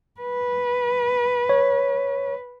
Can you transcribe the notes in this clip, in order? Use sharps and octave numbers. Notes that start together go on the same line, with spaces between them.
B4
C#5